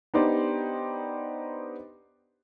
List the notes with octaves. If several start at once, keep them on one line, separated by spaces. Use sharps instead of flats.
B3 D4 D#4 G4 C5 D5